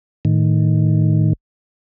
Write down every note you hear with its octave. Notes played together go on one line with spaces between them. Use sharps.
A2 D#3